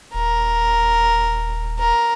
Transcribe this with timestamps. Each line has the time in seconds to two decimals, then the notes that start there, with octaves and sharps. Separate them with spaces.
0.14 D#1 A#4
1.79 A#4